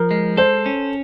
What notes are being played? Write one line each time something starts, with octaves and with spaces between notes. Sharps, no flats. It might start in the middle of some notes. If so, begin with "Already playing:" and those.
Already playing: F3 A#4
G#3
A4 C5
C#4